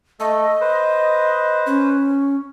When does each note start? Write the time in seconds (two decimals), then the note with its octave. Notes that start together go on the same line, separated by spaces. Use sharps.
0.20 A3 A4 D#5
0.61 B4 C5
1.66 C#4